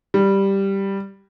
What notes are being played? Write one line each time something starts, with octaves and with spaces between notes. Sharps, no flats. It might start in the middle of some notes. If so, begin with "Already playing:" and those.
G3